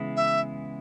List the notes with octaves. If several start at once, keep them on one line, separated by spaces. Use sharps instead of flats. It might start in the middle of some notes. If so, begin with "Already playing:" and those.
Already playing: C#3 E3 G#3 B3 E4
E5